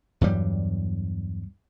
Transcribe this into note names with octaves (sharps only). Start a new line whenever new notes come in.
E2 G2 F#3 G3